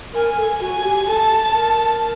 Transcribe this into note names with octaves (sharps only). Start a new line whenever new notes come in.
A#4 G#5
A4
F#4 G#5
G4
A4 A5
A#4